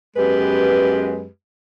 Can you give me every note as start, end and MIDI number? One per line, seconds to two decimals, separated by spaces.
0.17 1.26 42
0.17 1.26 56
0.17 1.26 59
0.17 1.26 67
0.17 1.26 71